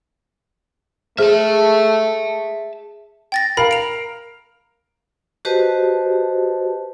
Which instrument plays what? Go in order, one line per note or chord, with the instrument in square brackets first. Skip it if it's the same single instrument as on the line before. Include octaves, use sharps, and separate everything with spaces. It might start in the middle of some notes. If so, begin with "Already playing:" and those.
[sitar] G#3 [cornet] A3 [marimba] G#4 C5 F6 [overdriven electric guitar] E5 A5
[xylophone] G5 A6 A#6
[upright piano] A#4 F5 [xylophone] B5
[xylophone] D7 F7
[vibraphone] F#4 G4 B4 C5 D#5 A5